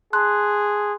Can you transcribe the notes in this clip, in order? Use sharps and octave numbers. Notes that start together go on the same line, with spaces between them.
G#4 A5 C6 F#6